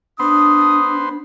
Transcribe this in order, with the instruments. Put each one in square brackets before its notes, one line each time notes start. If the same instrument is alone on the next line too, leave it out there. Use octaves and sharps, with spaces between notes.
[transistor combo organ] B3 C5 [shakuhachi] D4 [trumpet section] D#6